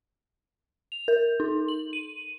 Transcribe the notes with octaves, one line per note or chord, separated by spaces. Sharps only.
F7
A#4
D#4
F#7
D#7